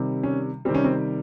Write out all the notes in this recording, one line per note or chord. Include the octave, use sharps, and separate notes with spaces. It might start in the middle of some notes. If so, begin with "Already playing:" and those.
Already playing: C3 D#3 G3
C#4
C3 D#3 G3 C4
C#4
C4